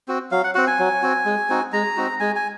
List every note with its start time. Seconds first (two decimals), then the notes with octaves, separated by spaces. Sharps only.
0.08 C4 F#4
0.31 F#3 F5
0.44 F#5
0.55 C4 F#4 F#5
0.67 G#5
0.79 F#3
1.03 C4 F#4
1.25 G#3
1.50 C4 D#4 F#4
1.73 G#3 A#5
1.97 C4 D#4 F#4
2.20 G#3 G#5
2.36 G#5